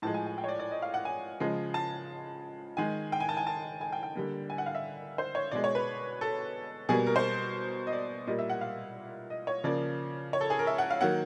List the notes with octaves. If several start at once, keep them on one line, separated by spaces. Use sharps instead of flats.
A2 F3 G#3 A5
G#5
G#5
G5
C#5
D5
D5
D#5
F5
F#5
G#5
C#3 F3 G#3
A5
D#3 G#3 G#5
G5
G#5
A5
G#5
A5
G#5
G5
G5
D3 G3 A#3
G#5
F#5
F5
E5
C5
C#5
B2 G#3 D5
C#5
B4
A4
B2 G3 A#3 G#4
A#4
C5
D#5
D5
A#2 G3 A#3 D#5
E5
F#5
F5
D#5
C#5
C#3 F3 A#3 D5
C#5
A4
G#4
A#4
E5
F#5
F5
D#3 F#3 A#3 F#5